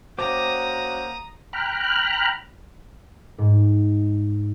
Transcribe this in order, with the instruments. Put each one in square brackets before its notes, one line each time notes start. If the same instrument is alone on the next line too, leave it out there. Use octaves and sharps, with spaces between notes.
[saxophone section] A#3 C#4 F#4 [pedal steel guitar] C5 G5 D6 [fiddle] A#5 D#6
[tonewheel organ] G5 A#5 B5 F6 F#6
[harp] G#2